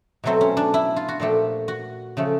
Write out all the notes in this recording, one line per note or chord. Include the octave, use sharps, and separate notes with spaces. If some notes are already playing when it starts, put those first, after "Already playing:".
B2 F#3 A3 C4
C#4
D4
E4
F4
F#4
A#2 F3 A3 G4
F#4
C#3 F3 A3